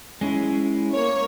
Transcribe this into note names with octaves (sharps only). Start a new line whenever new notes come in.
G#3 C#4 E4
A#3 C#5